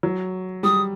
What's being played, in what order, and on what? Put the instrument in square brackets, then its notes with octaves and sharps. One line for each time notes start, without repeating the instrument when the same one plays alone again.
[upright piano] F#3
[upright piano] G3 [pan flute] D#6